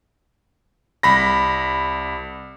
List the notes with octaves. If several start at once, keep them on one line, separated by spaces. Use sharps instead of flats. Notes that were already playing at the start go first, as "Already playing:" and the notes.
C2 B5 A#6